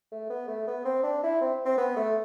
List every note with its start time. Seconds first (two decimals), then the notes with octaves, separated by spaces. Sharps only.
0.12 A3
0.30 B3
0.48 A3
0.67 B3
0.85 C4
1.03 D4
1.23 E4
1.41 C4
1.65 C4
1.78 B3
1.97 A3